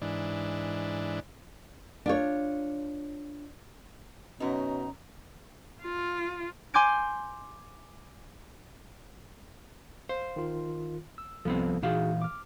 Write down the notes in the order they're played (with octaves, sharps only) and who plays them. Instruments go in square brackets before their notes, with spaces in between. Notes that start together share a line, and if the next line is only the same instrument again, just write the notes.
[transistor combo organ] G#2 E3 D4
[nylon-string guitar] D4 F4 C#5
[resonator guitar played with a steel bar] F#2 D#4 [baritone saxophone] B2 [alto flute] C#4
[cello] F4
[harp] G#5 C6 D6 G6 G#6 D7
[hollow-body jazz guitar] C5 [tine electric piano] F5
[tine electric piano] D#3 F4
E6
[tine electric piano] C2 A4 [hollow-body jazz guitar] F3 B3 C4
[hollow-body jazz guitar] A#2 E3 F5 [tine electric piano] D#4 F#4 G#4
[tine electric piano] D6 F6